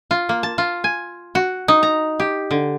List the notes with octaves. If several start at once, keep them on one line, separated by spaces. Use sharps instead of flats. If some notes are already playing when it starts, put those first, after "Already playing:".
F4
A#3
A5
F4
G#5
F#4
D#4
A#5
G4
D3